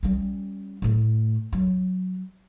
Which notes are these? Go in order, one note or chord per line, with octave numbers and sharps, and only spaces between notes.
G3 C#4
A2 A3
F#3